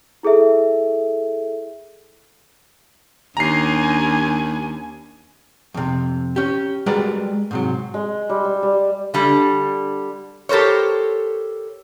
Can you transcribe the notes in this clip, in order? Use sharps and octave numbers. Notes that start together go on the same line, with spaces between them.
E4 G#4 A4 E5
D#2 C#4 D4 G#5 A#5 C7
F2 C3
C#4 G4
G3 G#3 F#4 A#4 B4 D5
G#2 C3 F#3
G#3
G3
G3
G3
D3 G3
G4 A4 A#4 C5 C#5